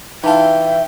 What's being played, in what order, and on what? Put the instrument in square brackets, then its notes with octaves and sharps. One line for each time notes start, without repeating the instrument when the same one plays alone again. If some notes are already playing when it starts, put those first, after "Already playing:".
[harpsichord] E3 F4 [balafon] D#4 A5 [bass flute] E5 [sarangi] G5